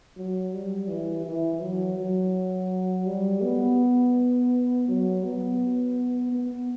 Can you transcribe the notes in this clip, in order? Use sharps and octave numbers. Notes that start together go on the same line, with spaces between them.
F#3
G3
E3
E3
F#3
F#3
G3
B3
F#3
B3
B3